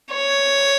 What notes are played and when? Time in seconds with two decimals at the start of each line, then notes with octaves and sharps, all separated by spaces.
0.14 C#5